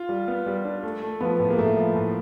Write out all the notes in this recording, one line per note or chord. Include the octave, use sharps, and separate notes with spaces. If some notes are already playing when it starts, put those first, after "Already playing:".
Already playing: F4
G3
B3
G3
D4
A3
A3
F3 B3
A2
A#3
A2 A3
F3
A2